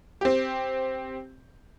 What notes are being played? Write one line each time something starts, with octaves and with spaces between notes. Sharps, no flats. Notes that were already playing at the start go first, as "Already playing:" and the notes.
C4 G4